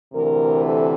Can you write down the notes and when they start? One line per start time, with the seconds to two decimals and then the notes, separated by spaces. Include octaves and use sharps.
0.13 D2 C3 E3 A#4
0.64 A4